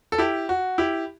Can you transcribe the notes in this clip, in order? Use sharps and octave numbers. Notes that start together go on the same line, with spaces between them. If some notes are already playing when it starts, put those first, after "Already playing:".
A4
E4 G4
F#4
E4 G4